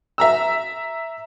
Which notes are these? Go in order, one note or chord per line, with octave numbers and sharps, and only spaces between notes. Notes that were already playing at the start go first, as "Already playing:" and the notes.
E5 A#5 E6